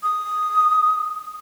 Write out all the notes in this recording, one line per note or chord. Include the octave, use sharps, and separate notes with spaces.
D#6